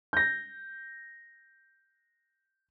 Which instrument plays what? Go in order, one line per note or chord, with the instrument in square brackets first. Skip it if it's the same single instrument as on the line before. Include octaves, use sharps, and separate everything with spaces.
[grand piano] G6 A#6